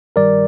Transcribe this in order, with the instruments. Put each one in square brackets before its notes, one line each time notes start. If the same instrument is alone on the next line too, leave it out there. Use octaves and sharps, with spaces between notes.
[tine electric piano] G2 D#3 G3 A#4 D5